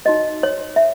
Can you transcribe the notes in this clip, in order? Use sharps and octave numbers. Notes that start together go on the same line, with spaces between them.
D#4 F#4 C#5 D#5
C#5
E5